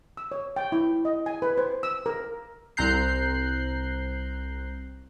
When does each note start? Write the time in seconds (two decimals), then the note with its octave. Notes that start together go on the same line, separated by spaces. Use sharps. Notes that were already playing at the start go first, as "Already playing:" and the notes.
0.17 E6
0.32 C#5
0.56 G5
0.72 E4
1.05 D#5
1.26 G#5
1.42 B4
1.58 C5
1.83 E6
2.06 A#4
2.77 C2 C4 A#5 F#6 G6 C7